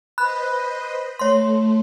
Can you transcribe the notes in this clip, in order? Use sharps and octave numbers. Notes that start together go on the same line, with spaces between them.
B4 C5 D#5 B5 F#6
A3 C#5 C6